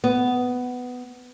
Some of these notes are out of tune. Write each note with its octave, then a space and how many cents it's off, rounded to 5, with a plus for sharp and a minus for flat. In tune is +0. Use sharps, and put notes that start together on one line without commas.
B3 +10